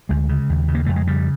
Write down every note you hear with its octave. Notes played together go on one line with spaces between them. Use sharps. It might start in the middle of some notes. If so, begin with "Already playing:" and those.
D2 G#3
C#3
D#2
C#3
A#3
F2 A3
G#3
C#3 G3